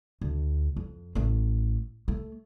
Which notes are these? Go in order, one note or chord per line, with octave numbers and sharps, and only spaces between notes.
D2
F2
A1 A3
A3